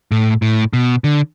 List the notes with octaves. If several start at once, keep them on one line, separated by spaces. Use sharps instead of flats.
A2
A2
B2
D3